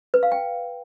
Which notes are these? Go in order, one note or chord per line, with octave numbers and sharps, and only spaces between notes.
B4
F5
G5